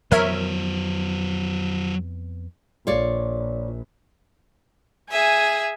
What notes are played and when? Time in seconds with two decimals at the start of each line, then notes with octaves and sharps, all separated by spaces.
0.12 F2 E3 F#3 B3 A#4 C5 C#5 E5
2.87 A#1 F4 C#5 D5
5.11 G#4 E5 G#5